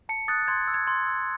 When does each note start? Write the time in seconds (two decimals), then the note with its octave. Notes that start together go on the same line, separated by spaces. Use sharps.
0.09 A5 C#7
0.28 D#6 F#6 A6
0.48 C6 G#6
0.68 E6
0.74 G#6
0.87 C6 G#6
1.07 E6